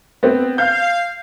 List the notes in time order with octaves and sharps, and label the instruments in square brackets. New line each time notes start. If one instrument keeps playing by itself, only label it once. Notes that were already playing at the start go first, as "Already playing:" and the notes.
[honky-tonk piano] B3 C4
[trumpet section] F5 [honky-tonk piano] G6